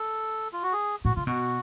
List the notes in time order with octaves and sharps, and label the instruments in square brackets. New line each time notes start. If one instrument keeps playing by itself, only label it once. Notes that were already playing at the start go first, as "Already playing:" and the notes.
Already playing: [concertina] A4
F4
F#4
G#4
[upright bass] A2 [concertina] F#4
[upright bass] C#3 [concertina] F4
[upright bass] B2 [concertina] F#4